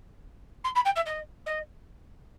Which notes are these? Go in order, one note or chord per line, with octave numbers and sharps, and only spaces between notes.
C6
B5
G5
E5
D#5
D#5